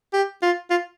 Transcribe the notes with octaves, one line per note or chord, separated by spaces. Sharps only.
G4
F4
F4